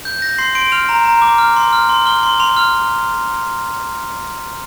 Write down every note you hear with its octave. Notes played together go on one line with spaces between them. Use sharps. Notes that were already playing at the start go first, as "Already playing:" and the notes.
G6
G6 A#6
C6 C7
C6 D7
F6 F7
A#5
A#5
D6
F6
C6
F6
C6
F6 G7
C6
C6 F7
F6